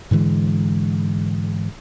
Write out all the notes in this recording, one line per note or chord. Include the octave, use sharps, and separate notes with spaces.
G#2 D3 E3 G#3